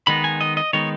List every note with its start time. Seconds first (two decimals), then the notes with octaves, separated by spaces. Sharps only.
0.07 D#3 G#3 B3 D#4 B5
0.24 G#5
0.41 D#5
0.57 D#5
0.73 D#3 G#3 B3 D#4 C#5